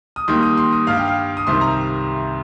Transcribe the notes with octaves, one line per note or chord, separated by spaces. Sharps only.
D#6
D#2 D#3 G3 C6
D#6
C6
D#6
G2 G3 F5
G5
F5
D#6
C2 C3 D#3 G3 C6
A#5